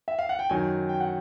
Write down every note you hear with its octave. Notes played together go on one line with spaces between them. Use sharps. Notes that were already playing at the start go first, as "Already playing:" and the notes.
E5
F5
F#5
G5
F#2 D#3 F#3 G#5
G5
F#5